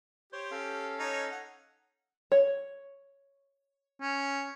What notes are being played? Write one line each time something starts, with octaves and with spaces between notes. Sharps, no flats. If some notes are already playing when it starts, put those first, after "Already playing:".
G4 C5 C#5 C6
C#4 A4 F5
D#4 C#5
F#5
C#5
C#4